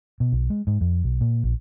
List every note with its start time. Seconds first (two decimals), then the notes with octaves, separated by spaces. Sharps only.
0.20 B2
0.32 B1
0.50 G#3
0.67 G#2
0.81 F2
1.04 B1
1.21 A#2
1.44 A#1